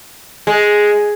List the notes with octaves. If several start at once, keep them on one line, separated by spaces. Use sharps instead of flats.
G#3